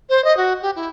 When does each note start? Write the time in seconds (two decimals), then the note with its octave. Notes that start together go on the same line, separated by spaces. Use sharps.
0.10 C5
0.24 D#5
0.37 F#4
0.62 G4
0.76 E4